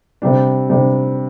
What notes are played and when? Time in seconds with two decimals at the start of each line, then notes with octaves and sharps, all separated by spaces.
0.22 C3 G3 D4
0.69 C3 G3 D4